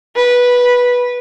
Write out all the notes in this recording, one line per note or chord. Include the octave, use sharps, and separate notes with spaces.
B4